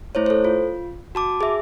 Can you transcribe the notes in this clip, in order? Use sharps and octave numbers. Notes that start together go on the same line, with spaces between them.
A3 E4 C5 C#5
A4 C5
F4
F#4 A5 D6
G#4 E5